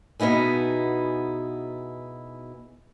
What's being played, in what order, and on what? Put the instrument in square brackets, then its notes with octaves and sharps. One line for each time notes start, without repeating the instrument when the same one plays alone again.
[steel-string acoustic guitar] B2 B3 D#4 E4 G#4